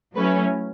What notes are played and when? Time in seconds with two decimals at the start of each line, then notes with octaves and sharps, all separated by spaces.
0.15 F#3 A3 C#4 E4 B4